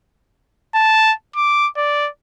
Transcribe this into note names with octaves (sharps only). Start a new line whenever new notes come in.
A5
D6
D5